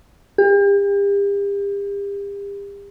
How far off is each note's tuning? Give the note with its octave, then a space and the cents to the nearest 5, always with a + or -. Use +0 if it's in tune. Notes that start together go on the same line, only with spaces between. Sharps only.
G4 +40